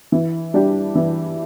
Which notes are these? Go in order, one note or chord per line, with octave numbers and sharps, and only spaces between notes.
E3
G3 D4 G4
E3